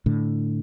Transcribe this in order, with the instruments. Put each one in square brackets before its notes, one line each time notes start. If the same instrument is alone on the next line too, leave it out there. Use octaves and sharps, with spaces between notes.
[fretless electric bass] A2 D3